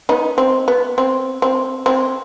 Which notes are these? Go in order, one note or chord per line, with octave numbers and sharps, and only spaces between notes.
B3 D#4
C4
B3
C4
C4
C4